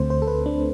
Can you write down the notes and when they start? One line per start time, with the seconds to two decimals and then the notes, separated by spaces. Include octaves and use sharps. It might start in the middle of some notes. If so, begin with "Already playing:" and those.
Already playing: D2 D3 A3 C4 C5
0.10 C5
0.22 A4
0.27 B4
0.46 D4